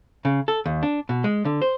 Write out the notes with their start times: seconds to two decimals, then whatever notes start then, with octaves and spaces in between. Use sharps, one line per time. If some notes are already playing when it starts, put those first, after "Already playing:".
0.25 C#3
0.48 A4
0.66 D#2
0.83 D4
1.09 B2
1.24 G#3
1.45 D3
1.62 C5